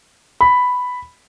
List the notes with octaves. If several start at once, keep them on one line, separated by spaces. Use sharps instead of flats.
B5